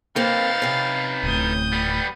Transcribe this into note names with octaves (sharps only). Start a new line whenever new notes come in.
A#3 C4 D#4 B4 F5 A6
C3 C#4
D1 A2 D#6 G6
G3 B3